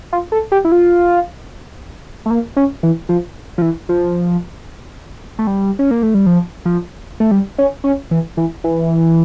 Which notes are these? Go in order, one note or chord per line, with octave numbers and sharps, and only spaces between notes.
F4
A4
G4
E4
F4
A3
A#3
C#4
E3
F3
F3
E3
F3
A3
G3
C#4
A#3
A3
G3
F3
F3
A3
G3
C#4
C#4
E3
E3
E3